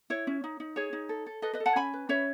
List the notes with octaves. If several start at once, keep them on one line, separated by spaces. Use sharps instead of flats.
E4 C#5
C#4
D#4
D#4
G#4 C#5
D#4
A4
A4
A4 B4 D#5
B4 D#5
A4
F#5 A5
C#4 G#5 B5
B4
C#4 C#5 E5